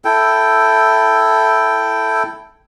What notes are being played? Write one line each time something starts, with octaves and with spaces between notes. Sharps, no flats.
E4 A4 G5